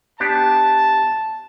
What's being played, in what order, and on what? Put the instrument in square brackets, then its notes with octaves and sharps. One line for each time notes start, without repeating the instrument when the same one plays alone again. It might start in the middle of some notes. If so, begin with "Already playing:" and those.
[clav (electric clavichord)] B3 D4 G4 [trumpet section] A5